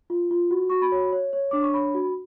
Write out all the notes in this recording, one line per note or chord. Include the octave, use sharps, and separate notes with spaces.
F4
F4
F#4
F#4 C#6
B5
C#5
C#5
C#5
D4 D6
C#6
C#5 B5
F#4